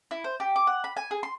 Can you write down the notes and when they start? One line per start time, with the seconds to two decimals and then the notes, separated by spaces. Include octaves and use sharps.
0.11 E4
0.24 C5
0.40 G4
0.56 D6
0.67 F#5
0.84 B5
0.97 G#5
1.11 G#4
1.23 C6